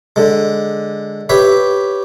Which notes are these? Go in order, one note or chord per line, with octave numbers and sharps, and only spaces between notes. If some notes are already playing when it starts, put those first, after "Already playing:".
D3 G#3
G4 B4 C#5 E5